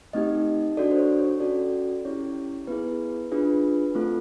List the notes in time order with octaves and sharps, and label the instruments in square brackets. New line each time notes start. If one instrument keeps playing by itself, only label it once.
[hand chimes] A3 C4 D#4 G4 D#5
D4 F#4 A4 D5
C5
C#5
C#5
C#4 F#4 A4 D5
C#4 E4 G4 C#5
B3 E4 G#4 B4
D4 F4 G#4 B4
A3 C4 F4 A4